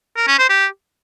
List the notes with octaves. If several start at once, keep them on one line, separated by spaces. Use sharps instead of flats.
A#4
C#4
C5
G4